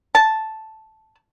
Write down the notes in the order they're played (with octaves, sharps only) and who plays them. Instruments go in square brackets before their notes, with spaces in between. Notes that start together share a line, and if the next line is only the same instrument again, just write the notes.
[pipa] A5